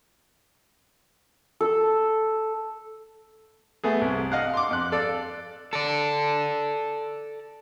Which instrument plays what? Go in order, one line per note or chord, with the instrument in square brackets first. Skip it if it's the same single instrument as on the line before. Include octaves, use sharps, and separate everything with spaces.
[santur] A4
[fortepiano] A3 B3 G#4
C2
D#5 F5 F#5
C6 D6
F2 F#6
A4 D5 F5
[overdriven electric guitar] A4 D5